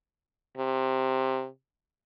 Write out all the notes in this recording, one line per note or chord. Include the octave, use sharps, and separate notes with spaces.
C3